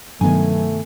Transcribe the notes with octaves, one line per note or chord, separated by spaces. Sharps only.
G2 C3 D#3 F#3 A3 B3 G#5